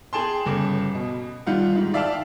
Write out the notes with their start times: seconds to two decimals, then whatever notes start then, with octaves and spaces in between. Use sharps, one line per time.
0.13 G#4 G5 A5 C6
0.46 G1 C#3 D6
0.95 B2
1.47 D#3 G3 F4 F5 F#5
1.75 G#2 D#3
1.94 D5 E5 F5 G5 A5 D6